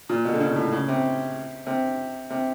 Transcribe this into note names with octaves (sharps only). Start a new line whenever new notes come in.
A#2
B2
D3
C#3
A2
C#3
C3
C3
C3